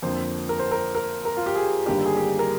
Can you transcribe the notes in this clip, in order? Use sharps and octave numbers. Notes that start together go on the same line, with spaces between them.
F2 D3 F3 A#3 C5
A#4
C5
A#4
A#4
A#4
F4
G4
G#4
G1 G2 D#3 A#3 D4 G4
G#4
G4
A#4